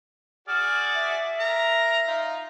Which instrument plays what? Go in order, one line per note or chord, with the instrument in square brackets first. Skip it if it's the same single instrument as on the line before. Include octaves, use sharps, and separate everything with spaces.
[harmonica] F#4 G#4 D5 [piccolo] F6
[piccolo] E5
[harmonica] A#4 A#5
D#4 F4